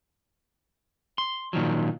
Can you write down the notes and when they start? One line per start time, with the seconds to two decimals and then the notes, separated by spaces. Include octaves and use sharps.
1.18 C6
1.53 A#2 D#3 F3 F#3